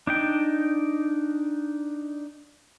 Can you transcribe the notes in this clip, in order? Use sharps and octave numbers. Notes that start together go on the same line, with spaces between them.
D4 D#4 G5